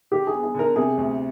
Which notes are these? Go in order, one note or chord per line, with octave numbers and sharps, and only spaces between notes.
D3 G4
G#4
B3
G#4
D3 A#4
C3 G#4
D2